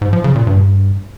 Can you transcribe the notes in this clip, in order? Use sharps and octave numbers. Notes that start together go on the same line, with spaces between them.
G#2
F3
C#3
A#2
G2